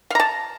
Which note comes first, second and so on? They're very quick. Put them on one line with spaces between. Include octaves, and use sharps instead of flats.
F5 A#5 A5